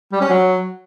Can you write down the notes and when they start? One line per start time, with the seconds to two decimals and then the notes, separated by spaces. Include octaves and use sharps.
0.12 G3
0.21 C#4
0.30 F#3